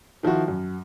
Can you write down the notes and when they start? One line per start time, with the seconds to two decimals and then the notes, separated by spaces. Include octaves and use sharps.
0.23 D#3 F3 E4 F#4
0.48 F#2